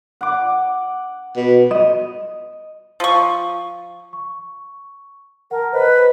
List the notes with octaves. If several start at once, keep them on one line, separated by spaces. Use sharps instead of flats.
F#5 D6
B2
D#5
F3 C#6
C#6
A#4 F#5 A5
B4 C5 D#5 F#6